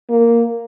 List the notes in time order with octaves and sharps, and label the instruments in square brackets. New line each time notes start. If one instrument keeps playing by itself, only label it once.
[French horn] A#3